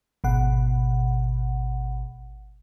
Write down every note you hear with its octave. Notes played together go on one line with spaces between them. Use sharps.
G#1 B2 F#5